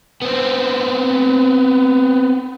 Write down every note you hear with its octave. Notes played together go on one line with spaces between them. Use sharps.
B3 C4